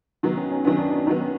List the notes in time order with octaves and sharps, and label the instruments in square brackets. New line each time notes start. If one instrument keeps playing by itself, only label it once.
[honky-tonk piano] D#3 F#3 B3
[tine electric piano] C#4
C#4
[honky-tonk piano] D#3 F#3 B3 [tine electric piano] D4
[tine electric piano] D4
D4
[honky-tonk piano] D#3 F#3 B3 [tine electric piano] D#4
[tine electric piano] C#4